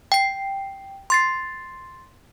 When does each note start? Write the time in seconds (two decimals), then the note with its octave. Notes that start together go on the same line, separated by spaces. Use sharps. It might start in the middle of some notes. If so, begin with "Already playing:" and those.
0.12 G5 C7
1.10 C6 A6 C7